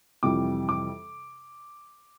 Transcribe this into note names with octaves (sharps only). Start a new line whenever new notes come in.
F2 C3 E3 G3 D6
D6